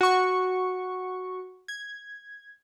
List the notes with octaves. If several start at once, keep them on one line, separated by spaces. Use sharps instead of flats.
F#4 C#6
G#6